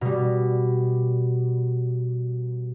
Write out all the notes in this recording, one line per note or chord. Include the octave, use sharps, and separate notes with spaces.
B2 G3